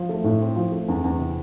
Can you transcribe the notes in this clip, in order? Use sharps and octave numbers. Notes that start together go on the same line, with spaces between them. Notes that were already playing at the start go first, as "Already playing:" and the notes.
Already playing: F3
A3
A2
C4
F3
A3
E2
E2
C3